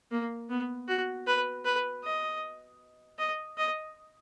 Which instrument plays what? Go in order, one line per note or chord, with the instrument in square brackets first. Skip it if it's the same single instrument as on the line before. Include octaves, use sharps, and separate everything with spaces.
[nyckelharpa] A#3
B3
F#4
B4
B4
D#5
D#5
D#5